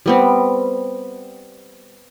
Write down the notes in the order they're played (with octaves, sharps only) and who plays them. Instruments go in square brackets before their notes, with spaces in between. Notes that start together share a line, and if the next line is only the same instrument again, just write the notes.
[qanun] G3 B3 C4